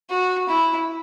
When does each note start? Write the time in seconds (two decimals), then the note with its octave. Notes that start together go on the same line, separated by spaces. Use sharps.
0.10 F#4
0.48 E4